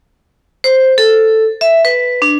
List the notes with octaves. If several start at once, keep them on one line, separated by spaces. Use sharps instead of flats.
C5
A4
E5
B4
D4